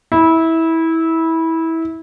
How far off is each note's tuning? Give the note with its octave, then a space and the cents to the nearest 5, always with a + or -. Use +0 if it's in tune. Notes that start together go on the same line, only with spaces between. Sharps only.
E4 -20